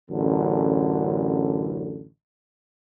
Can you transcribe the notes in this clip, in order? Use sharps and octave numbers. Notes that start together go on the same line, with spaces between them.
A1 F#2 D3